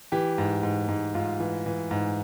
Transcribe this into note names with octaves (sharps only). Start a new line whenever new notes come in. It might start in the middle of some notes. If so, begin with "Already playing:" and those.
E3 G4
G#2
G#2
G#2
G#2 F4
E3
E3
G#2